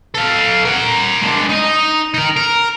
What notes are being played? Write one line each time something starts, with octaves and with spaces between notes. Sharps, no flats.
A4 F5
A#4 F#5
G#3 D4
D#4 D#5
D#4 A#4
A#4